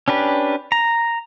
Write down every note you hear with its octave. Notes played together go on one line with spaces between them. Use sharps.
C#4 D4 G4 B4
A#5